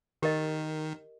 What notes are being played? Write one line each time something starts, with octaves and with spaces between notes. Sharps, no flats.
D#3 G4 A#4 D#5